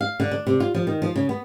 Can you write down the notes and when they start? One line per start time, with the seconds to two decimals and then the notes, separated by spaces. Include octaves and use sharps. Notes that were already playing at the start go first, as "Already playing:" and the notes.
0.01 F5
0.20 D3
0.31 D4
0.47 C3
0.60 F4
0.74 F3
0.87 D#3
1.02 F3
1.16 C#3
1.29 B3